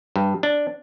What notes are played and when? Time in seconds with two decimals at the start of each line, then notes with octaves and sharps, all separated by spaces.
0.16 G2
0.43 D4